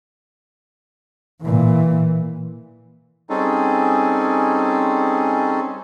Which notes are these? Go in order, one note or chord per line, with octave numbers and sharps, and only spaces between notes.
A#2 E3
G3 C4 C#4 D#4 G#4 A4